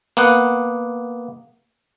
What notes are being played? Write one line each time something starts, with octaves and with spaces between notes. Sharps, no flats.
A#3 B3 F#5